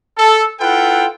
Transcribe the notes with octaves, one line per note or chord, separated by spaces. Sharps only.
A4
E4 F4 A4 B4 F#5 G5